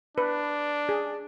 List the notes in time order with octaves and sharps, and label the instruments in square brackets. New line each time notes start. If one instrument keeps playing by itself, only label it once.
[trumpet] D4 [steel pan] B4
[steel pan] G#4